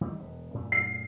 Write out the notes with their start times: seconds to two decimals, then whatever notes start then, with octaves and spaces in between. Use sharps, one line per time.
0.01 D#3 G3 A3
0.20 E1 B3
0.54 F#2 A#2 A3
0.72 C7